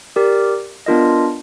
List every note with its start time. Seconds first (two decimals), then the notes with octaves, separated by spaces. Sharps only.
0.16 G4 A#4 D5
0.86 B3 D4 F4 A#4 D#5